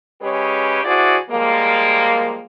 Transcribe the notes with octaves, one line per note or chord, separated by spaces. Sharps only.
C#3 G#3 C#4 G4 G#4 B4
D3 E4 F#4 G#4 C5 D5
F3 G3 G#3 A#3